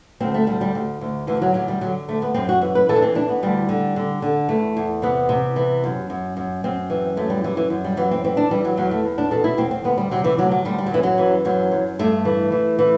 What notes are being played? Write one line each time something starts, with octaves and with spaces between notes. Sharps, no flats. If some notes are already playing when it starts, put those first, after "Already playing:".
D2 C4
A3
D2 G3
G3
D2
D2
D2 E3
F#3
D2 F#3
G3
D3 F#3
D2 A3
B3
F#2 C4
F#4
E3
B4
E3 A4
D4
C4
E3 D4
B3
D2 G3
D3
D3
D3
E2 A3
E2
C3 B3
C3
E3
F#2
F#2
F#2
F#2 C4
E3
F#2 A3
G3
E3 G3
E3
F#2
G3
E3 F#3
C4
E3 C4
D4
E3 G3
F#3
E2 F#3
A3
E2
D4
B2 A4
E4
E2 C4
C4
D2 B3
G3
C3 F#3
E3
D2 F#3
F#3
D2 G3
G3
F#3
F#2 E3
F#3
E3
F#2 F#3
F#2
G2 A3
E3
E3
E3